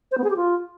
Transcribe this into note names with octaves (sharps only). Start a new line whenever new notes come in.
C5
B3
G#4
G4
F4